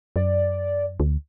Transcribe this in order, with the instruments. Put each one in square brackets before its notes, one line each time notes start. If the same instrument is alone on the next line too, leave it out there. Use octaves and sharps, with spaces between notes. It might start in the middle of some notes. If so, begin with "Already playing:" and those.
[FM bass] F#2 [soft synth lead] D5
[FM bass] D2